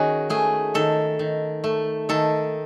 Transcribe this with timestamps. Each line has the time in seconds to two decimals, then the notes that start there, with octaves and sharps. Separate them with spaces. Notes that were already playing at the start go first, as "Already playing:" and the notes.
Already playing: D#3 C#4 F#4 G#4
0.30 A3 G#4
0.74 D#3 A4
1.19 D#3
1.64 A3
2.09 D#3 A4